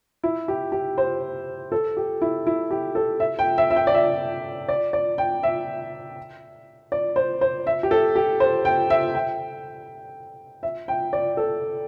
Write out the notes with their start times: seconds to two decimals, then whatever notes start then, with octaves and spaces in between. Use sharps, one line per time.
0.23 E4
0.48 G4
0.72 G4
0.98 C5
1.72 A4
1.97 G4
2.22 E4
2.47 E4
2.71 G4
2.95 A4
3.20 E5
3.39 G5
3.58 E5
3.70 E5
3.76 G5
3.87 D5
3.94 E5
4.69 D5
4.93 D5
5.18 G5
5.43 E5
6.92 D5
7.16 C5
7.41 C5
7.67 E5
7.83 G4
7.91 A4
8.16 G4
8.40 C5
8.65 G5
8.90 E5
9.15 G5
10.63 E5
10.88 G5
11.13 D5
11.37 A4